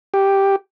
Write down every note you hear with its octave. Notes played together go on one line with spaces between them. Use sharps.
G4